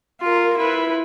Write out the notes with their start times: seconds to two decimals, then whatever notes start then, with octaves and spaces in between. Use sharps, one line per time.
0.21 F4 A#4
0.57 E4 B4